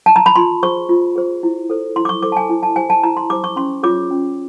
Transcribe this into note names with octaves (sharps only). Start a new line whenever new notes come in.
A5
A#5
B5
F4 C6
G#4 C5 C#6
F4
G#4 C5
E4
A4 C5
E4 C6
D6
C#6
A4 C5 D6
A5
G#5
E4 G#5
A5
G4 C5 G#5
A5
E4 A#5
C6
G4 C5 D6
C#6
C#4 C6
F4 G#4 C#5 D6
C#4